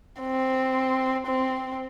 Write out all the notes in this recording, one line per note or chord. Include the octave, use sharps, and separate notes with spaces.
C4
C4